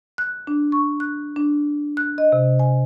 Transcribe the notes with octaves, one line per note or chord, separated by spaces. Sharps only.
F#6
D4
C#6
F#6
D4
F#6
D#5
C3
G#5